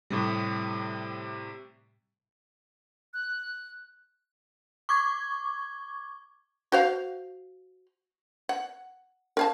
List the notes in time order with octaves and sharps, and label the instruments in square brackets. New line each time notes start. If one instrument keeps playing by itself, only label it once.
[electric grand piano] A2 C3 G3
[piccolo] F#6
[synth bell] C#6 D6 G#6
[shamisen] F#4 C5 F5
F#5
A#4 F5 A5